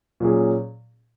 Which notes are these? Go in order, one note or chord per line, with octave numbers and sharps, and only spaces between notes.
A#2 F#3 C#4 G#4